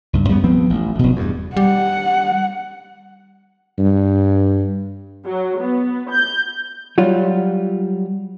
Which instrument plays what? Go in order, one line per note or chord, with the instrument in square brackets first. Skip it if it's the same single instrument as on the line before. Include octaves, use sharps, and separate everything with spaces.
[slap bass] C#2 G2
F#2 G3 B3
F3 B3 C4
A1
F1 B2
E2 G2
[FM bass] G3 [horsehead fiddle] F#5
[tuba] G2
[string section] F#3
B3
G6
[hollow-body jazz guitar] F#3 G3 F4